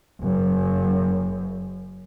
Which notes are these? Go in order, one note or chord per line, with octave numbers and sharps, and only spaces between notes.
F#1 F#2